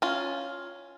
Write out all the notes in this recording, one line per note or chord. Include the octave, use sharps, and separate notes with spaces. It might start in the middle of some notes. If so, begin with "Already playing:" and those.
C#4 F4